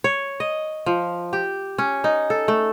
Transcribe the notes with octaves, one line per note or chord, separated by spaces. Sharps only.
C#5
D#5
F3
G4
C#4
D#4
A4
A3